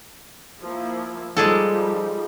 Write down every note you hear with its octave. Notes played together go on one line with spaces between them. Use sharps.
F3 A#3 E4
F3 G3 G#3 D#4 G#4 A4